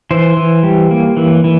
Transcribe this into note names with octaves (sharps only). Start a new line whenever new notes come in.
E3 C5
E3
G3
A#3
E3
E3